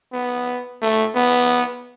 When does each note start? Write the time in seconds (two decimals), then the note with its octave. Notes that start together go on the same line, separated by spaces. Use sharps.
0.13 B3
0.82 A3
1.15 B3